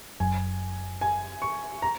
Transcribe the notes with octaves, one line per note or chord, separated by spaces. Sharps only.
F#1 F#2 F#3 G#5
G#5
C#6
A#5